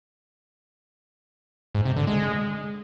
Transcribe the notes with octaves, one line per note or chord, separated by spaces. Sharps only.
G#2
C3
D3
G#3